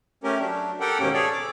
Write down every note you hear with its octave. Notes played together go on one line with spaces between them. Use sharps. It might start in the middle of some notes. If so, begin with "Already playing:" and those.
A3 C#4 G4 A#4
F#3 D4
G4 A4 A#4 F#5 G5
D#2 G#2 B2 A#3 C#4 G4
G#4 A4 C#5 D5
D6